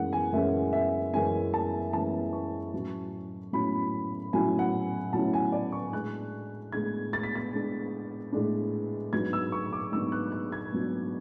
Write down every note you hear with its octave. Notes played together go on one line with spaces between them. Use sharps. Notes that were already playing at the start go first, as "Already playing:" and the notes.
Already playing: F#2 E3 G#3 C#4 F#5
G#5
F#2 E3 G#3 C#4 E5
E5
F#2 E3 G#3 C#4 G#5
A5
F#2 E3 G#3 C#4 A5
C#6
A2 F#3 C#4 E4
A2 F#3 C#4 E4 B5
A2 F#3 C#4 E4 G#5
F#5
A2 F#3 C#4 E4 A5
G#5
D5
C#6
A2 G#3 D4 F#6
A2 G#3 D4 G#6
A6
B6
A6
A2 G#3 D4
A2 G#3 D4
G#2 F#3 B3 D4 G#6
E6
C#6
D6
G#2 F#3 B3 D4 E6
F#6
F#6
G#6
G#2 F#3 B3 D4